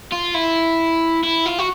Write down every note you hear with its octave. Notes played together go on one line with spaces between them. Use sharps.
F4
E4
E4
F4
F#4